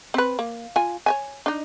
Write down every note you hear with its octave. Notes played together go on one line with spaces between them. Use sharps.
C4 B4
A#3
F4 G#5
C#5 E5 G#5
D4 D#4